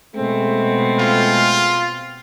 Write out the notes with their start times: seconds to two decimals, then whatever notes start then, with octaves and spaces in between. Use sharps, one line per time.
0.16 B2 G#3 A3 C4
1.00 F4